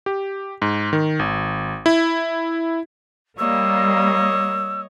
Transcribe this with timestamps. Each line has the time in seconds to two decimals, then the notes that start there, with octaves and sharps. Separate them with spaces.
0.06 G4
0.62 G#2
0.93 D#3
1.19 G#1
1.86 E4
3.38 G3 A#3 C#5 D#5 E6